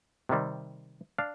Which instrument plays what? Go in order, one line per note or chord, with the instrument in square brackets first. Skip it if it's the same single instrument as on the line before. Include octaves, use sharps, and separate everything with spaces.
[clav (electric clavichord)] C3 D#3 G3 C4
D4 F5